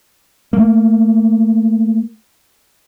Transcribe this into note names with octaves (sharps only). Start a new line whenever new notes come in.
A3 A#3